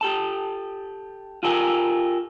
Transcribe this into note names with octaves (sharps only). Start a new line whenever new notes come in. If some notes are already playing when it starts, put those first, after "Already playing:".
G4 A4 A5
F4 G4 A4 A#4 E5 G#5